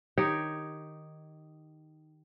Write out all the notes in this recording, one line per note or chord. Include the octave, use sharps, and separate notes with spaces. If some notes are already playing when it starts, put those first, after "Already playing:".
D#3 D#4 G4 C#5